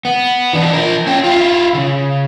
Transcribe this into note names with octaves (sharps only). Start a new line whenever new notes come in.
B3
E3 D4
F3 A#4
C#4 G5
E4 F4
C#3